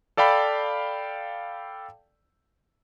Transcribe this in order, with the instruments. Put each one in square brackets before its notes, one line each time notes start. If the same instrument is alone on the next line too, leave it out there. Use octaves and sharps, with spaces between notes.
[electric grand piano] A4 D5 F5 G5 B5